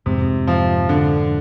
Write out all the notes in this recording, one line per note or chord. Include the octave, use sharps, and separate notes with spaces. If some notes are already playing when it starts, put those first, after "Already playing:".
F2 G#2 C3
F3
D3